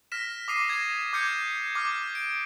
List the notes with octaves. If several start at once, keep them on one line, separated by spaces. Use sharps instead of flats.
F6 A#6 B6 E7
D6 D#6 C7 D#7
G#6 A#6
D6 F6 G6 G#6 C#7
D6 F6
D7